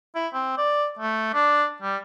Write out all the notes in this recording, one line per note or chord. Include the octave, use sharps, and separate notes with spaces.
E4
C4
D5
A3
D4
G3